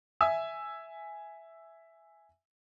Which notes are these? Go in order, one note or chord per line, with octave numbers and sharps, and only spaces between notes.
E5 G#5 E6